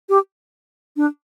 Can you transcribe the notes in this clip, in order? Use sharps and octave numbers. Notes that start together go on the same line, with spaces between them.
G4
D4